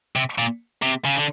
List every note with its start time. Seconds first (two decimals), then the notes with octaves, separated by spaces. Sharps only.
0.16 C3
0.38 A#2
0.82 C3
1.05 C#3
1.16 D3